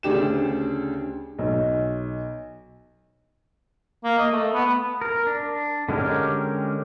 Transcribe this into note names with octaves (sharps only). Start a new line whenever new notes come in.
D2 C#3 D4 G4 E7
B1
A#3
D#5
A3
B3
A#4
D4
D3 G#3 C#4 G4 A#4